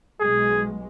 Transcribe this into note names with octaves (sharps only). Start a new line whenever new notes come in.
B1 G#3 G#4